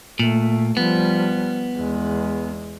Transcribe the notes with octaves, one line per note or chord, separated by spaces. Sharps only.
A#2 A3
F3 G3 B3
E2 G#3